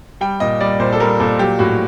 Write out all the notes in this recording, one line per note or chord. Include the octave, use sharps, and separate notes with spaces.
G3 G5
A#2 D#5
G3 D5
A#2 C5
A4
G3 A#4
A#2 A4
F#3 G4
A2 F#4